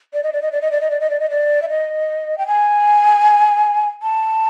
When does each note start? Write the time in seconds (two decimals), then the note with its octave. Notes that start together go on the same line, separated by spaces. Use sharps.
0.13 D5
0.23 D#5
0.33 D5
0.42 D#5
0.52 D5
0.61 D#5
0.72 D5
0.81 D#5
0.91 D5
1.00 D#5
1.10 D5
1.20 D#5
1.30 D5
1.62 E5
1.69 D#5
2.38 G5
2.47 G#5
4.02 A5